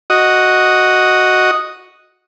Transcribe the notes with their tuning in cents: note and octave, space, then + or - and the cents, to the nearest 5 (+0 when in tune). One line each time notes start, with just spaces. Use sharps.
F#4 +0 D#5 +0